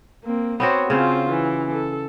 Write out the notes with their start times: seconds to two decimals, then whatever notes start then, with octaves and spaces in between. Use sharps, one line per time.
0.24 A#3 C4
0.60 B3 C4 F#4 C5 C#5
0.90 C#3 C4 C#4 F4 C5
1.29 E3
1.72 A4